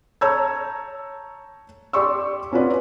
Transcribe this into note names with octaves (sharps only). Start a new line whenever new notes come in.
C#5 A5 A#5 E6 G6 G#6
G4 D5 C6 C#6 E6
C4 C#4 F4 F#4 B4 D5